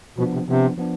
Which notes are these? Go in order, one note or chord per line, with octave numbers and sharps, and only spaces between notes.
B2 F3 B3 D4
C3
C3 F3 B3 D4
F3 B3 D4